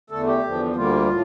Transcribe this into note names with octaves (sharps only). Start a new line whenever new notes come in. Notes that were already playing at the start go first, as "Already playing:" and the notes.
E2 D3 A3 A4
G4
E2 D3 F3
D2 D3 G3 A#3 F4
A2